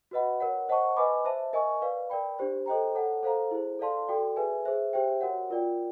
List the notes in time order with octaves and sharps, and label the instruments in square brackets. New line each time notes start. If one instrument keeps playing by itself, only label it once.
[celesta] F#4 B4 D#5 F#5 B5
A#4 C#5 F#5
C5 D#5 F#5 A5 C#6
B4 D#5 G#5 B5 D6
C5 E5 A5
A#4 D#5 G#5 C#6
B4 D5 F5
A#4 D5 G5 B5
D4 G4 C5
A4 C5 D#5 G5 A#5
A4 C#5 F#5 A5
A4 C5 F5 A#5
E4 G#4 C5
A4 D5 F5 A5 C6
F#4 A4 D5 G5
G#4 B4 E5 G#5
G#4 C5 E5
G4 C5 E5 G5
F#4 A#4 C#5 F#5
F4 A#4 D5 G5